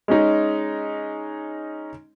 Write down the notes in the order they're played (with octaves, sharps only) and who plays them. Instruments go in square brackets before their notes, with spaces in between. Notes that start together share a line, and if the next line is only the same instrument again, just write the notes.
[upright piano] G#3 C#4 D#4